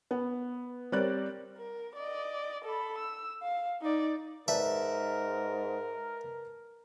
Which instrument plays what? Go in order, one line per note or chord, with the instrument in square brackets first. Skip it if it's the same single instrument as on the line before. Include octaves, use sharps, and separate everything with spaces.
[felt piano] B3
G3 C4 A#4 C#5 D5 F#6
[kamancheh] A#4
D5 D#5
A4 B5
E6
F5
D#4 D5
[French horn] G#2 [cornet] A#4 [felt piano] B4 D5 A5 [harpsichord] E5